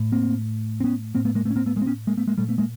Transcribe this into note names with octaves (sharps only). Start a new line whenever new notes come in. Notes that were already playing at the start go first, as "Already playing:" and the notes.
Already playing: A2
A#3 C4
C4
B3 C#4
A2 A#3 C4
A3 B3
G#3 A#3
A3 B3
C#4
A#3 C4
A3 B3
G#3 A#3
C4
B3 C#4
G#3 A#3
A3 B3
G#3 A#3
A#2 G3 A3
A3 B3
G#3 A#3